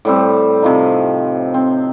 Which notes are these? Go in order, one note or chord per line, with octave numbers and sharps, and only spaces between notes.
A2 G3 C4
C3 F3 D#4
C4